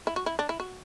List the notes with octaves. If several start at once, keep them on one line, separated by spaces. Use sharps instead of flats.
E4
F#4
E4
D4
E4
F#4